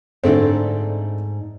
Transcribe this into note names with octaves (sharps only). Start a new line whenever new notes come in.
G#2 D3 A3 C4 D#4 D5